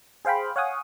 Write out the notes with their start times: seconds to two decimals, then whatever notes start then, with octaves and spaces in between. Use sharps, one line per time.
0.25 G#4 C5 F5 G5 B5
0.56 C#5 F5 F#5 G#5 D#6